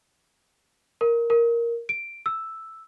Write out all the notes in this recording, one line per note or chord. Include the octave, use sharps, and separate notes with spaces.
A#4
A#4
D7
E6